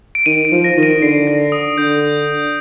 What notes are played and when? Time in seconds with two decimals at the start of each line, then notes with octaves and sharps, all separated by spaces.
0.15 D7
0.26 D#3 D#7
0.45 D7
0.52 F3
0.64 A#6
0.77 D#3
0.83 D#7
1.02 D3 C7
1.27 A#6
1.52 D#6
1.78 D3 G6